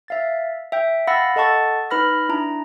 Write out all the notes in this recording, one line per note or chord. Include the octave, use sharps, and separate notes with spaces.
E5 F5 A6
E5 G5 G6
F5 F#5 B5 E6 A6 A#6
A4 D#5 F#5 A5 C#6 A6
D#4 B4 B5 F6 A#6
D4 E4 A#5